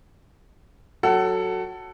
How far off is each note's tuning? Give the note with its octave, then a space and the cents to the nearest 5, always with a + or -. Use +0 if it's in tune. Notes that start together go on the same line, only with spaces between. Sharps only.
F#3 +0 A4 +10 F#5 +25